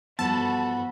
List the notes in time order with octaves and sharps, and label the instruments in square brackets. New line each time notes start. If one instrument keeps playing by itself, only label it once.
[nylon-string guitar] G2 E3 F3 [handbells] B3 [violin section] F#4 A4 B5 [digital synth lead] A5